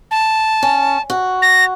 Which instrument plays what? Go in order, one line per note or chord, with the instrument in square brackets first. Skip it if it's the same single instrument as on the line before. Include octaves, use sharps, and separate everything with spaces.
[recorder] A5
[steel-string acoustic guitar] C#4
F#4
[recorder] A#6